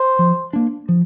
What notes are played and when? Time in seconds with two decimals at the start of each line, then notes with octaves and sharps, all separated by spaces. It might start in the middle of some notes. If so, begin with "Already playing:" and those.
Already playing: C5
0.19 F3
0.53 A#3 D4
0.89 F3